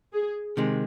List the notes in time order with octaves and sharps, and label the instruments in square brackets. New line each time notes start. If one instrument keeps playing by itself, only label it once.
[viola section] G#4
[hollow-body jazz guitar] C3 D#3 G#3